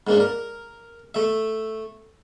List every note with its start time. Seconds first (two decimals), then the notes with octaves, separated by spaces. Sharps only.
0.07 G#2 A#3 D4
0.20 A#4
1.15 A3 E5